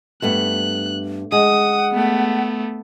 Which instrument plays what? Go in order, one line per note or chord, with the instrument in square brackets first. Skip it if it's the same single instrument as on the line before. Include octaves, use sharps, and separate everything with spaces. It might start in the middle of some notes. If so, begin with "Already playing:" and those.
[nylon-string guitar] G2 A3 B3 [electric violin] F#6
[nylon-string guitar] G#3 [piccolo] F#5 [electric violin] D#6
[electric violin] A3 B3